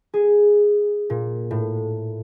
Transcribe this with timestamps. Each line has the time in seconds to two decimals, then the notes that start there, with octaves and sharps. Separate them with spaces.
0.14 G#4
1.10 A#2
1.51 A2